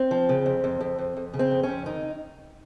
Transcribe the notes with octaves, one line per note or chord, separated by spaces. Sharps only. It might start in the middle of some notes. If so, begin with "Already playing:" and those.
Already playing: C4
F3
C#3
F2
F2
F2
F2
F2
C#3
C4
F2
C#4
F2
D#3 D#4